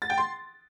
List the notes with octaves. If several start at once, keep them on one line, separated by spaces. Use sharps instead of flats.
A6
G5
C6